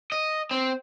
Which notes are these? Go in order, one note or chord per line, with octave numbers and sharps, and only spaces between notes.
D#5
C4